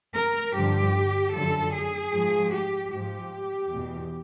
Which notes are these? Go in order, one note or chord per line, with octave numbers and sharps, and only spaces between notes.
A#4
G2 D3 F3 G4
F#2 D3 F3 A4
G#4
G#2 F3
G4
G#2 F3 G4
E2 B2